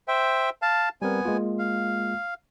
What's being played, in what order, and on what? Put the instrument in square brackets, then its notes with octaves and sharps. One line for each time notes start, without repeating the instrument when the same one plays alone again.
[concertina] C5 E5 G5
F5 A5
[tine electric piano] G3 C4 A#4 [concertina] B3 G#5
[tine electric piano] G#3 A#3 F4
[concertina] F5